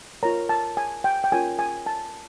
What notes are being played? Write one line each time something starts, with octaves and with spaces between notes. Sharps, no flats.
F4 A#4 C#5 A#5
A5
G#5
G5
G5
C#4 F4 A#4 C#5 G#5
G#5
A5